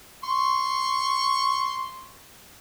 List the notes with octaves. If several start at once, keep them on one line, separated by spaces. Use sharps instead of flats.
C6 C#6